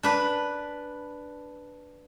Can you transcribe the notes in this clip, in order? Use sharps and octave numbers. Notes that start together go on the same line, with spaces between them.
D4 B4